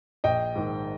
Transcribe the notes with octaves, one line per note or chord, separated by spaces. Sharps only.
A#1 D#5 G5
G#2 D#3